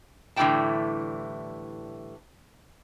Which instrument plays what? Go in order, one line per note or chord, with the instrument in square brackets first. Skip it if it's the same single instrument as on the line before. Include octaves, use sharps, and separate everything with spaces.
[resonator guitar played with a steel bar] A2 D3 E3 G3 G5 A5